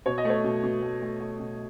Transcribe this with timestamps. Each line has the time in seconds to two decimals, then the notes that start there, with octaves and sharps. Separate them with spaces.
0.06 B2 C#5
0.18 D#5
0.25 A3 C#5
0.44 B2
0.63 B2
0.82 A3
1.02 A3
1.20 A3
1.40 B2